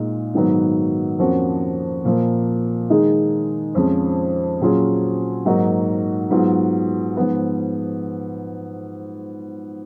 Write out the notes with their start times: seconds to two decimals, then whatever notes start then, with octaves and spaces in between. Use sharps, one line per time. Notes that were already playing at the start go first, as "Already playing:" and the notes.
Already playing: A#2 G#3 D#4
0.34 G#2 D#3 F#3 B3
1.19 F2 F3 A#3 C#4 F#4
2.05 A#2 F3 A#3
2.90 D#3 G#3 D#4 G#4
3.75 F2 F3 G#3 C#4
4.61 A#2 F#3 C#4 F4 G#4
5.45 G#2 F#3 A#3 D#4 F#4
6.31 G#2 F#3 B3 F4 G#4
7.17 G#2 F3 B3